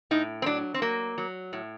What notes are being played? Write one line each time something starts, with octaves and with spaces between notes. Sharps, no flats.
A2 D#4
C4
F#3 D4
C4
F#3 A#3
F#3
A2